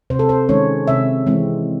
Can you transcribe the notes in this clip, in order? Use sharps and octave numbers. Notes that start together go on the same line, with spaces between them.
C3 C5
A4
C5
D#3 G#3 C#4 C#5
C3 E5
E3 G#3 C4